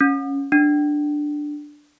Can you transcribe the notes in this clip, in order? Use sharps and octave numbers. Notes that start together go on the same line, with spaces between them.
C#4
D4